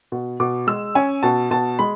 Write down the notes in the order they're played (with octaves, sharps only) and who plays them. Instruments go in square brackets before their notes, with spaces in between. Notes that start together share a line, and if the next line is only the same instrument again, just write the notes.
[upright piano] B2
B2 D6
G#3 E6
C#4 G#5
B2 A5
B2 A5
G#3 B5